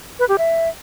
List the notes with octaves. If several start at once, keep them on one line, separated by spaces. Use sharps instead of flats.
B4
G4
E5